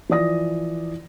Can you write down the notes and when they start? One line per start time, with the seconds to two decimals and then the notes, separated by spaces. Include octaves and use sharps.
0.09 E3 F3 D5 D#6 A#6